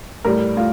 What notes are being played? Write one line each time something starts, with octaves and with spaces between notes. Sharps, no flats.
A2 G3 A#4
A2 F4